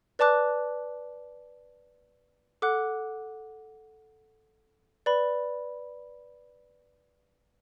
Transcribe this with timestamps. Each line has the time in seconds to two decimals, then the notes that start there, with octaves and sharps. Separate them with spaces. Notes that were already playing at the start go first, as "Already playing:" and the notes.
0.19 B4 D5 A5 D6 F#6
2.62 A4 F#5 D6 F#6
5.06 B4 D5 B5